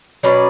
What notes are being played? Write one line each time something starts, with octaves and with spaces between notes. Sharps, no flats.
B2 F#3 C#4 B4 D5